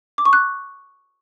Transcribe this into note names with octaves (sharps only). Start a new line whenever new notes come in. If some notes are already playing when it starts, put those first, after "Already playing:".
D6
C#6
F#6